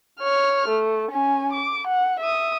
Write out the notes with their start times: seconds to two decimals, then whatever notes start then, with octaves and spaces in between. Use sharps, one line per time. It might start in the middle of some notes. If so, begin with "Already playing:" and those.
0.20 C#5 F6
0.69 A3
1.11 C#4 G#5
1.53 D6
1.87 F#5
2.20 E5 D#6